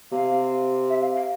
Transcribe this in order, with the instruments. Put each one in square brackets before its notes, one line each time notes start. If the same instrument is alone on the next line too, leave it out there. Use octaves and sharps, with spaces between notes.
[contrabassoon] C3 [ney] F5
[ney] E5
F5
F5